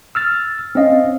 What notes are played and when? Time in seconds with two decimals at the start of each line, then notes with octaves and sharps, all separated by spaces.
0.15 E6 F6 A6
0.75 C4 C#4 D#5 F5